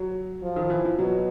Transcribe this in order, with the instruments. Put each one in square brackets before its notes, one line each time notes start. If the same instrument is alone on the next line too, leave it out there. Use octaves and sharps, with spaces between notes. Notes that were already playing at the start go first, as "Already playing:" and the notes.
Already playing: [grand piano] F#3
[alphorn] F3
[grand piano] D#3
E3
F3
[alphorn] B2 [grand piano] F#3